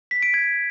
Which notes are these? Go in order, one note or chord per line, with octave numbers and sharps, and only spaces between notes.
B6
D7
G#6